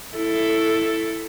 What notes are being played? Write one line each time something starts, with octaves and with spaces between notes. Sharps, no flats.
E4 A4